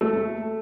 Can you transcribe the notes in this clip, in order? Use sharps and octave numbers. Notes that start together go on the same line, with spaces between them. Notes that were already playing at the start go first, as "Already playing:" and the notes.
A3